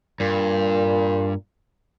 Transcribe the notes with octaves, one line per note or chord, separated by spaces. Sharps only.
G2 A#2